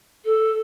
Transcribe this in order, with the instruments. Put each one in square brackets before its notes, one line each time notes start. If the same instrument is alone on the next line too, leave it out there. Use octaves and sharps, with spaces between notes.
[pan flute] A4